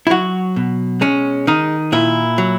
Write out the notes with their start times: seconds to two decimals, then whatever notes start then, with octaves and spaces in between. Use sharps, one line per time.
0.07 E4
0.10 F#3 F#4
0.56 B2
1.01 G#3 C#4
1.47 D#3 D#4
1.92 A#2 E4
2.38 F#3